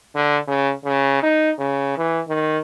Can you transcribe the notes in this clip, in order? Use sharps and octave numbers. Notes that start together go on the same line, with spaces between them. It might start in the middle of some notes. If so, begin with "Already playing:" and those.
D3
C#3
C#3
D#4
C#3
E3
D#3